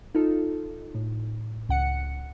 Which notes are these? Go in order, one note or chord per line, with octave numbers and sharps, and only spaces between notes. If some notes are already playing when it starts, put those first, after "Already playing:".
D#4 F4 A4
A2
C#2 F#5 C#7